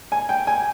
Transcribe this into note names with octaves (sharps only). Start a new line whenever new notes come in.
G#5
G5
G#5